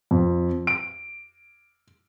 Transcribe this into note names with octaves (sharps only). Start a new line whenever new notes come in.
F2
D7